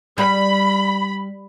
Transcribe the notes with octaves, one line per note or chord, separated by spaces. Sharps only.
G3 B5